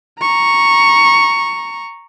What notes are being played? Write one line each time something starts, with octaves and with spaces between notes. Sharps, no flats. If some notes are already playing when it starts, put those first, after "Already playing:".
A#5 C#6